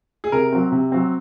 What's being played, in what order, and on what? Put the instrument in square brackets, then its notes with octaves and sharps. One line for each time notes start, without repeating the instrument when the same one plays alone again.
[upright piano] G#4
[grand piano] C3 [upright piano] A#4
[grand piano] F#3 C4
C3
F#3 C4